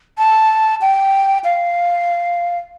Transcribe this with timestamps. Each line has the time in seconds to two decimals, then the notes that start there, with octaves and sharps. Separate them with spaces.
0.18 A5
0.81 G5
1.44 F5